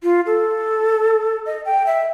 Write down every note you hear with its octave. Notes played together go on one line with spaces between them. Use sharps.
F4
A4
D#5
G5
E5